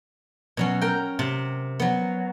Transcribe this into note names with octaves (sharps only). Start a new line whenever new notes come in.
B2 F#3 C#4
A#4 G5
C3
F#3 B3